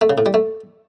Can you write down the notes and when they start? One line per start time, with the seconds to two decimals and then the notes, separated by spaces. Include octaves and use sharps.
0.01 A3
0.10 C#3
0.18 A2
0.26 G3
0.34 A3